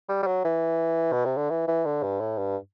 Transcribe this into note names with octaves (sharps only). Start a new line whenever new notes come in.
G3
G3
F#3
E3
B2
C3
D3
E3
E3
D3
G2
A2
G2